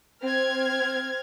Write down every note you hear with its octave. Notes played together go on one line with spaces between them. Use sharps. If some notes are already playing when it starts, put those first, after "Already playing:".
C4 F6 G#6